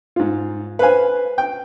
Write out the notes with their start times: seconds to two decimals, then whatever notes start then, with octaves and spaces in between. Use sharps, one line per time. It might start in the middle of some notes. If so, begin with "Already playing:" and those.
0.16 G#2 F4
0.79 B4 C5 F5 G#5
1.38 G5